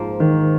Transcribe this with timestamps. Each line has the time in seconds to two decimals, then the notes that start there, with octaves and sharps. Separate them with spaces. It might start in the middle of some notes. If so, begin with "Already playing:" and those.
Already playing: G#2 F3 A#3
0.20 D#3